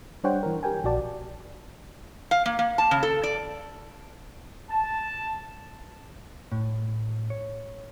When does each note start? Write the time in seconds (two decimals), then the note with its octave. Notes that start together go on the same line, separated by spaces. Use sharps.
0.24 G3 D4 C5 C#5 F#5 G5
0.43 E3 A#4
0.63 G4 A#4 G5 G#5
0.84 A#1 F#4 D5 A5
2.31 F5
2.46 A#3
2.59 A#3
2.78 A5
2.91 C#3
3.03 A4
3.23 D5
4.69 A5
6.52 A2
7.30 C#5